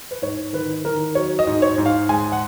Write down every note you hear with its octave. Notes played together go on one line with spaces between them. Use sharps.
B4
G#2 C#5
D#3 B4
D#3 A#4
F#3 C#5
D#5
G#2
C#5
G#2
F5
G#3 G#5
F#5